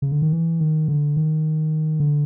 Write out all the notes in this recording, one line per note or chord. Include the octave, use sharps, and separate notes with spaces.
C#3
D3
D#3
E3
D#3
D3
D#3
D3